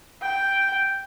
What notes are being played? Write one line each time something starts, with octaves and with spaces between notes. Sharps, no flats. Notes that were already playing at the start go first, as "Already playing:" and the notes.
G5